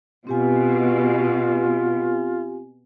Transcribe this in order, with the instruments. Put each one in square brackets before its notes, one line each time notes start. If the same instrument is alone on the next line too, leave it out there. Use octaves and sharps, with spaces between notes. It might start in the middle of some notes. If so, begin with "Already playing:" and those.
[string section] B2 [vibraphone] C4 G4 G#5 [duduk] F4